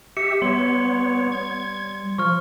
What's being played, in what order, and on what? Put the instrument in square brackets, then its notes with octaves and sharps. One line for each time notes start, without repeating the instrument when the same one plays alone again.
[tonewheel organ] G4 E5 [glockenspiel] C#7
[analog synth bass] G3 [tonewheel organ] B3 C#5 [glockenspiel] C6
[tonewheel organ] G#6
[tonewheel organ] F3 [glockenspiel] C#6 F6